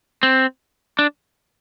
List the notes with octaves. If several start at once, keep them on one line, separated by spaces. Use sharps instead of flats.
C4
D4